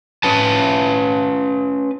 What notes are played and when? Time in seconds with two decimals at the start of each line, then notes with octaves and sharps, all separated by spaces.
0.23 C#4 B4 A5